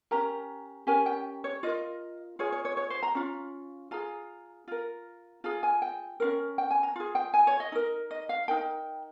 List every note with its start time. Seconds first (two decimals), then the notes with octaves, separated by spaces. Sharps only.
0.11 C#4 G4 A#4 A#5
0.87 C#4 G4 A#4 G#5
1.06 G5
1.44 C#5
1.63 F4 A#4 D#5
2.39 F4 G#4 C#5
2.52 C#5
2.65 C#5
2.77 C#5
2.90 C5
3.03 A#5
3.15 C#4 F4
3.91 F4 G#4 A#5
4.68 F4 A#4
5.44 F4 G#4 A#5
5.63 G#5
5.82 G5
6.20 C#4 F4 A#4
6.58 G5
6.71 G#5
6.83 A#5
6.96 F4 G#4
7.15 G5
7.34 G#5
7.47 C#5
7.60 D#5
7.72 D#4 A#4
8.11 D#5
8.29 F5
8.48 D#4 A#4 G5